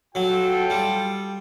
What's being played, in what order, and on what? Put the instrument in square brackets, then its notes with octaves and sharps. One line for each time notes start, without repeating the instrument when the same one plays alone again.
[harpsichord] F#3 [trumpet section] F4 A4 G5
[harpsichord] G3